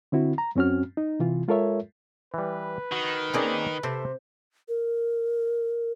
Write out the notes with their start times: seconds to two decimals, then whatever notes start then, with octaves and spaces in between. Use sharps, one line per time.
0.12 D3 C4 E4 F#4
0.38 A#5
0.55 F#2 C4 C#4 F#4 F6
0.97 D#4
1.20 C3 E3 F4
1.48 G#3 F4 A4 A#4 C#5 E5
2.34 E3 G3 B4
2.92 D#3 F#4
3.34 A#3 C4 C#4 D#4 G#4 D5
3.83 C3 A4 C5 E5
4.69 A#4